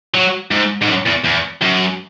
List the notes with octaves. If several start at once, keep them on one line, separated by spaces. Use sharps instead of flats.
F#3
G#2
G#2
F#2
E2
E2
F#2